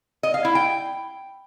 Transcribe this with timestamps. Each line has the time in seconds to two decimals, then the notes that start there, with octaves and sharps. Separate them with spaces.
0.23 D#5
0.34 F5
0.45 E4
0.55 G5